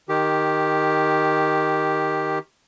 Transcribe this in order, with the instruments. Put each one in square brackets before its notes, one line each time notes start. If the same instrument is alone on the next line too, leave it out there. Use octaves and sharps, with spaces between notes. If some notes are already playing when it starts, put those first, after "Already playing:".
[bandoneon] D#3 G4